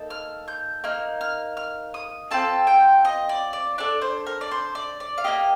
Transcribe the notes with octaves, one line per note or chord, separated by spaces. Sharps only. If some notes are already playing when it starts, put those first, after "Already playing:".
Already playing: A#3 D#4 A4
F6
G6
A#3 D#4 F6
F6
F6
D#6
C4 F4 A4 A5
G5
D#5
D5
D5
D4 A4 D5
C5
A#4
D5
C5
D5
D5
F5
A#3 D4 G4 D#5